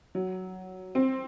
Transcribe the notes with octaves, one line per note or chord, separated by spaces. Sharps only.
F#3
C4